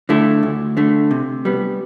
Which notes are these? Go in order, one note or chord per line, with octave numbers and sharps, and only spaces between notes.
D3 A3 E4
D2
D3 A3
C3
G3 B3